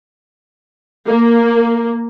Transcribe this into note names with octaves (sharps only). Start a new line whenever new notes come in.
A#3